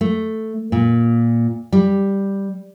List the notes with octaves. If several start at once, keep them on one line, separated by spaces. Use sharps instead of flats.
A3
A#2
G3